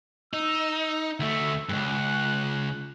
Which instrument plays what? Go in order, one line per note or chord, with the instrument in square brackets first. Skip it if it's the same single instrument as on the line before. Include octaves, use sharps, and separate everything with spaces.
[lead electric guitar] D#4 [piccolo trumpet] E6
[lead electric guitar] D2 A3 [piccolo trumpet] E5
[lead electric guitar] C#2 G2 [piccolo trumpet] F#6